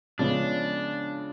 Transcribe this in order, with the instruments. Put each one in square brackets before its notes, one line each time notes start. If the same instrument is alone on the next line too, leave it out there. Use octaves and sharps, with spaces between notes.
[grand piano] C#3 F3 G#3 B3 [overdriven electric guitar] D4